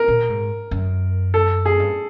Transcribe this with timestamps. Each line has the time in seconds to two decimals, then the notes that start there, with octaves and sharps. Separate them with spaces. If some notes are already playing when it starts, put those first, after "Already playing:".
Already playing: A#4
0.08 A#2
0.29 G#2
0.71 F#2
1.34 A4
1.66 G#4
1.80 G2